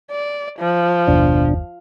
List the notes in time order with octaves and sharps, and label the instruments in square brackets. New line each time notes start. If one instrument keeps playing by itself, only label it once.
[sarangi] D5
F3
[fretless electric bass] F#1 D#2 D#3 [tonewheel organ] B2 D4